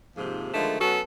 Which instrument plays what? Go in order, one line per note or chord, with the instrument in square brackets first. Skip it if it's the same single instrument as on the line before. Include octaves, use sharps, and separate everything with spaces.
[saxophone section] D#2 G#2 C3 F3
D3 D#3 F3 G#3 A3
F#3 B3 C#4 F#4 A4